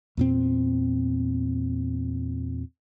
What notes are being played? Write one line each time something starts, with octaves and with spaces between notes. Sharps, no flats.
E2 A#2 C4